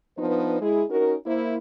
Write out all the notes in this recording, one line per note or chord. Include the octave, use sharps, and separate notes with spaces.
F3 B3 D4 D#4 B4 C5
G#3 E4 G#4
C#4 D#4 F#4 A#4
A#3 E4 C5